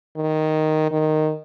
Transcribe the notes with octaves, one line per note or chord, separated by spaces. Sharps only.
D#3
D#3